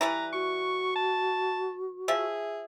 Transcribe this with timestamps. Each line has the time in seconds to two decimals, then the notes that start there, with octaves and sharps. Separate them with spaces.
0.01 E3 G3 B4 A#5
0.33 F#4 C#6
0.96 A5
2.08 F3 G#4 E5